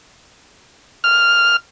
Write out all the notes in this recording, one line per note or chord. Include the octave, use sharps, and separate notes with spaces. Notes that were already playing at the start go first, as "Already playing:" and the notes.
F6